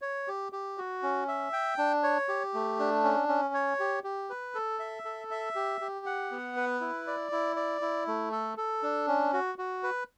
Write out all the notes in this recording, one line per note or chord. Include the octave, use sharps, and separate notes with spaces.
C#5
G4
G4
F#4
C#4
E5
G5
D4
C#5
G4
A3
D4
C#4
C#4
C#5
G4
G4
B4
A4
E5
A4
E5
G4
G4
F#5
B3
B4
E4
D5
E4
D5
E4
A3
A4
A4
D4
C#4
F#4
F#4
B4